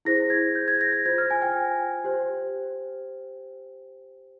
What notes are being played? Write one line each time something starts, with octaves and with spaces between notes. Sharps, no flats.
E4 G#4 C5 A#6
G#6
G6
G#6
A#6
A#6
F4 C5 G#6
F6
G#5
G5
G4 C5